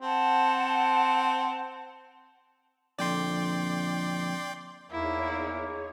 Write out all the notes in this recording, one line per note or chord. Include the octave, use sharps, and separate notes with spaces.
C4 F#5 A5
F2 A#2 D3 D5 G5 C6
E2 A#3 D#4 E4 G#4 C#5